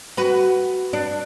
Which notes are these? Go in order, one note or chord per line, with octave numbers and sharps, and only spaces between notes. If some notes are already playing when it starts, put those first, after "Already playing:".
F#4 B4
D4